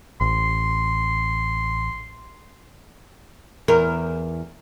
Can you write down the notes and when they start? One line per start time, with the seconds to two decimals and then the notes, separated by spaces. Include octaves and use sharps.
0.21 A1 C6
3.68 E2 A#4